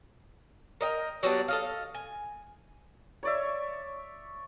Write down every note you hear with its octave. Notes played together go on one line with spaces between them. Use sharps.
A#4 D#5 G5
F#3 G3 B3 D4
A4 D#5 F5
G#5
C#5 D5 E5